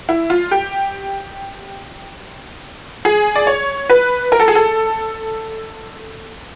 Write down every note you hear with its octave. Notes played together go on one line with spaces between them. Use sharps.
E4
F4
G4
G#4
D5
C#5
B4
A#4
A4
G#4
A4